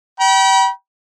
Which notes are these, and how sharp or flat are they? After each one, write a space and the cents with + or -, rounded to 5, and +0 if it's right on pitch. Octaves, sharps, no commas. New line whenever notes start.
G5 -30 B5 -40